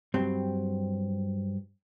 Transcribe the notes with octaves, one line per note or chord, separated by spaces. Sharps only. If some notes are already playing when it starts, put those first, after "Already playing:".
G2 F#3 C4